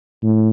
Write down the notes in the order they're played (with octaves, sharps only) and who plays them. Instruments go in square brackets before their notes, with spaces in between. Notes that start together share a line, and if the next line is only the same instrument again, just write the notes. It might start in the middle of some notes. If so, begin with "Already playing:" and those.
[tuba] A2